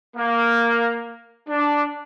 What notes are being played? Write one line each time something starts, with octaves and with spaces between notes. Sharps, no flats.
A#3
D4